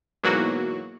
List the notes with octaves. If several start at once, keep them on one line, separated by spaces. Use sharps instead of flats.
G#2 B2 E3 F#3 A#3 F#4